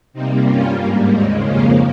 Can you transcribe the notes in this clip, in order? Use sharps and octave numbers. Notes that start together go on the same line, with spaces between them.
C3 G3 A#3 C4 D#4
G2 G3 A#3 C#4 F4
G#2 G3 A#3
D#2 C#3 G#3 C4 D#4
F2 C#3 F3 A#3 C#4 F4